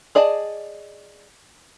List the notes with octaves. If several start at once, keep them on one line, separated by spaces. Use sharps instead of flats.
G#4 D5 D#5 A5